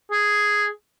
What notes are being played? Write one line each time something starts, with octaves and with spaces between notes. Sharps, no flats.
G#4